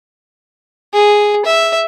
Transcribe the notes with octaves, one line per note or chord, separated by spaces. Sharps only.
G#4
E5